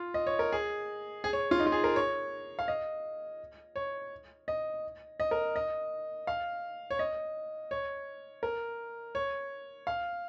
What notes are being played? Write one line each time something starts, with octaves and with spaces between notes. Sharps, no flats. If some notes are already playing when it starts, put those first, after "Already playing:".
Already playing: F4
D#5
C#5
A#4
G#4
G#4
C#5
F4
D#4
F4
G#4
A#4
C#5
F5
D#5
C#5
D#5
D#5
A#4
D#5
F5
C#5
D#5
C#5
A#4
C#5
F5